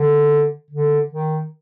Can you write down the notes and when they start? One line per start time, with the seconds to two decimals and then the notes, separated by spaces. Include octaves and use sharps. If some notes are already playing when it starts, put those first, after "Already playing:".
Already playing: D3
0.71 D3
1.11 D#3